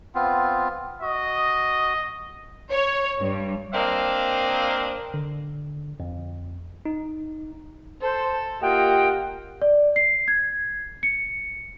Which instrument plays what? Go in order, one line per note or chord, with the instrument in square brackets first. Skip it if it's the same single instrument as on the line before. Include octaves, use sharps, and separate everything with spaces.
[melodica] B3 C4 F4
[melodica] F#4 [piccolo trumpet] D#5
[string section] C#5
G2
[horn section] A#3 C4 D4 D#5 F5
[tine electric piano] D3
F2
D#4
[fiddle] A4 [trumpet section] C5
[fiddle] A#3 [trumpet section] F4 D#5 F#5 [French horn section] G4 [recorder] G5
[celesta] D5
C7
G#6
C#7